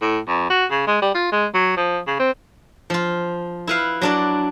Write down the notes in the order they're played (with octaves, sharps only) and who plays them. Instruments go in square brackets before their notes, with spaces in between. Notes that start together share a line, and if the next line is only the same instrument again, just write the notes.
[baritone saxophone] A2
F2
F#4
C#3
G#3
G3
F4
G#3
F#3
F3
C#3
C4
[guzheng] F3 F4
E4 B4 F5
F#3 D4 D5